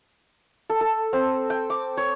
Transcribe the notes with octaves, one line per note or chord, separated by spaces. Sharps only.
A4
A4
C4
G5
D6
C#5